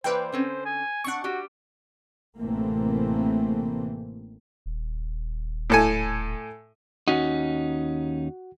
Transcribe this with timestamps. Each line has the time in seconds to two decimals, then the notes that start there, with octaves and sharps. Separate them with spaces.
0.04 E3 A#3 B4 C5 D5 G5
0.32 D3 C4 C#4
0.66 G#5
1.04 C4 D4 F#5 C#6
1.24 G3 F#4 G4
2.38 A1 C3 E3 A3 A#3 C4
4.66 D#1
5.70 A2 A4 G#5
7.08 D#2 C#4 D#4 F#4 F#5